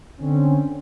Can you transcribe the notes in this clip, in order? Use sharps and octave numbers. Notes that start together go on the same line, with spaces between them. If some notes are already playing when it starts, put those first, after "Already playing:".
D3 C4 C#4